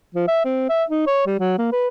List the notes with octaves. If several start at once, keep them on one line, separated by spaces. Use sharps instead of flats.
F3
E5
C4
E5
D#4
C#5
G3
F#3
A#3
B4